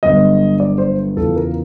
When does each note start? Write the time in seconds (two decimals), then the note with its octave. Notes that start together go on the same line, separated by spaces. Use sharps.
0.03 G1 G2 D3 F#3 D#5
0.60 D5
0.78 C5
1.16 E2 C#3 F3 A4
1.36 A#4